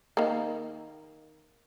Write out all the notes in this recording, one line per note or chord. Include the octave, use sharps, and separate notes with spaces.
D#3 A#3